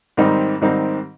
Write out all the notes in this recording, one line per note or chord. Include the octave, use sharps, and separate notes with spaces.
G#2 D#3 G3 C4 D#4
G#2 D#3 G3 C4 D#4